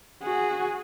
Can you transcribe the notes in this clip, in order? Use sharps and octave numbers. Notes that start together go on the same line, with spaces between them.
F#4 G#4